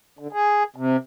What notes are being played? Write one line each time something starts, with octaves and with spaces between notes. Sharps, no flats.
D3
G#4
C3